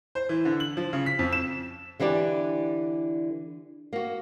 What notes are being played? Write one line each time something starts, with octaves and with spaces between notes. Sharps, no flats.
C5
E3
D3
F#7
F3
C#3
B6
F2
E7
D3 E3 D4 G4 D5
A#3 F#4